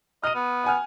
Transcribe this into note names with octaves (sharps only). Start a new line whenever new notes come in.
D#5 F6 D#7
B3
F#5 G#5 F6